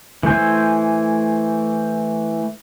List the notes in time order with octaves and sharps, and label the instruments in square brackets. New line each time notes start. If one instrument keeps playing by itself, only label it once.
[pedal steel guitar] E3 A3 C5 G#5